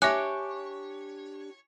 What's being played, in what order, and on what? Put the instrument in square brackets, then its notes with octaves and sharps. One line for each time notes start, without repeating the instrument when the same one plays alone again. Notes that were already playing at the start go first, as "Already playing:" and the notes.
[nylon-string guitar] D4 G4 G5 [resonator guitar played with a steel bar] C#5 [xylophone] E5 F#6 [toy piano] G#5 D6